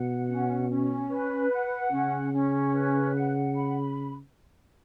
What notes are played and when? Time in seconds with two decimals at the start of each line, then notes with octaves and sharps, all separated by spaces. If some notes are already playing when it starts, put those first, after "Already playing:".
Already playing: B2 F#5
0.27 C#4
0.68 C#4
1.10 B4
1.50 F#5
1.91 C#3 C#4
2.32 C#4
2.73 B4
3.15 F#5
3.55 B5